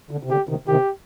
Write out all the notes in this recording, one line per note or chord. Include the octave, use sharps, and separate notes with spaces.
D3
C3
D3 G4
C3 D#3
C3 D#3 G4